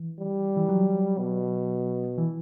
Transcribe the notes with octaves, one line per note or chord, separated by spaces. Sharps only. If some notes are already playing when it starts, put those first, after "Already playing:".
Already playing: E3
G3
E3
F#3
B2
E3